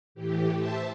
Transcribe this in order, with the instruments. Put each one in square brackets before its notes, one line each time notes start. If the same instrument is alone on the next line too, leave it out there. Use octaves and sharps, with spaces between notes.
[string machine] A2 E3 G4
C5 E5 A5